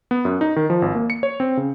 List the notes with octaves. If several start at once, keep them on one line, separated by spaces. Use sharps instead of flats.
B3
F#2
D#4
D#3
F3
G#1
A#3
C#7
C#5
C4
C#3